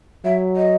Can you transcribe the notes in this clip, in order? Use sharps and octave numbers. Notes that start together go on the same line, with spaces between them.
F#3 E5
D#5